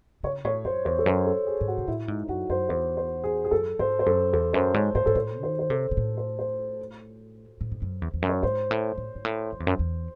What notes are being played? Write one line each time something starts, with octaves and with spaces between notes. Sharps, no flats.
C#3 C#5
A2 C#5
F#2 C5
E2 C5
A4
F#2 C5
A4
G#4
G#2
F#4
C3
A2 E4
G#2 D#4
F#2 F#4
F#2 C5
E2 C5
C5
G#4
G#4
F#2 A4
G#2 C5
C5
F#2 A4
E2 A4
F#2 C5
G#2 C#5
G#2 C5
G#2 A4
A2 C5
D#3 C5
C5
C3 A4
C3
A2
C5
C5
A2
G#2
F#2
E2
E2
F#2
C#5
G#2 C5
A2
A2
G#2
A2
F#2
E2
F#2
E2